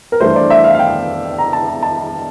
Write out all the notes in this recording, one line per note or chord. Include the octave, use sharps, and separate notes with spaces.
A#4
G2 E3 A3 C5
D5
E5
F5
F5
G5
A#5
A5
A5